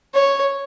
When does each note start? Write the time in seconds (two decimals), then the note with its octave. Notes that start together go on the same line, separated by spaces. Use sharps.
0.14 C#5